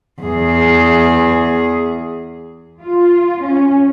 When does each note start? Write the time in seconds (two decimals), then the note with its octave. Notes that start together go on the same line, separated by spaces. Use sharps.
0.22 E2 G#4
2.82 F4
3.43 C#4